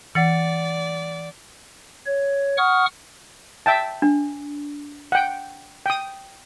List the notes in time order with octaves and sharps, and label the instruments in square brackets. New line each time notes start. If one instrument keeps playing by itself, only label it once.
[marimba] E3 [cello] D5 [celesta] F#5 A6 C#7
[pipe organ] C#5
F#5 C#6 D#6 F6
[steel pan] E5 G5 A5
[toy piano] D4
[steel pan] F#5 G5
G5 D#6